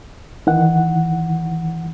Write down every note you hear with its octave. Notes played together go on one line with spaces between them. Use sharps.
D#3 E3 F#5